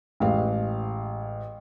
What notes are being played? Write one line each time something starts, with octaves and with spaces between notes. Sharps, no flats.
A1 G#3 F5